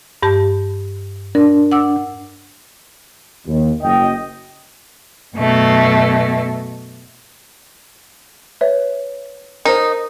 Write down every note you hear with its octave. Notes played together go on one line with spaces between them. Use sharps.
G2 G4 A5
D4 A#4
F#5 D6 E6
D#2
F#1 D#5 G5
F#2 B2 A3
B4 C#5 E5
D#4 A#4 C5